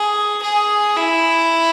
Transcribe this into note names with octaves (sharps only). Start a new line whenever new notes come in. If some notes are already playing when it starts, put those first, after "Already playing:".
Already playing: G#4
G#4
E4